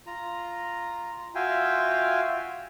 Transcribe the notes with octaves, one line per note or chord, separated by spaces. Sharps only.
F4 A#5
F4 F#4 E5 F5 G5 G#5